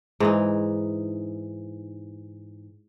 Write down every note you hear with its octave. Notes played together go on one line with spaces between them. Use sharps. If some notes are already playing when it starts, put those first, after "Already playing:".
G#2 E3 D#4